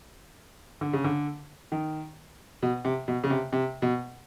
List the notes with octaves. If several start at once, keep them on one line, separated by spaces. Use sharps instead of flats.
D3
C#3
D3
D#3
B2
C3
B2
C#3
C3
C3
B2